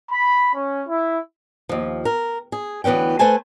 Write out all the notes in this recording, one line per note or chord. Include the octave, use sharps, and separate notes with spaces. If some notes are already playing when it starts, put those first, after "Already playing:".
B5
C#4
E4
D#2 F3
A#4
G#4
D2 E3 B3 C#4 G5
A3 B4 C5 G#5 A5